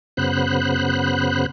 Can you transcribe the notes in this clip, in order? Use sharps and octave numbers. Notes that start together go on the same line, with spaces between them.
F#2 C#3 B3 C5 B5 F#6